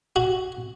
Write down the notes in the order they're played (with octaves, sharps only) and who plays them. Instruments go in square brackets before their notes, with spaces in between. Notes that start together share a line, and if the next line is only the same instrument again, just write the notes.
[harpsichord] F#4